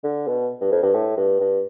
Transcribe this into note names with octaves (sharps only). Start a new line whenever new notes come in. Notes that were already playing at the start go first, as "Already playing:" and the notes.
D3
B2
G2
F2
G2
A2
G2
G2